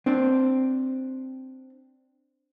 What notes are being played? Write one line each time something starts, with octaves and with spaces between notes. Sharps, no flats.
C4 D4 C5